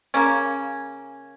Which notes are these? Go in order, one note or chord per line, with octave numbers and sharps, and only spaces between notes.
C#3 A#3 C#4